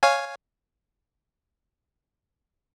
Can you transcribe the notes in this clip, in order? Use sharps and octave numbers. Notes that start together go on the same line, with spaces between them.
C#5 F5 G#5